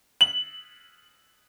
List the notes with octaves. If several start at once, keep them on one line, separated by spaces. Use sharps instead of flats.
F#7